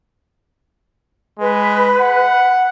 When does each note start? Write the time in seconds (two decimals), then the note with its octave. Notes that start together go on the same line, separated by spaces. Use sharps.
1.40 G#3 B4
2.01 F#5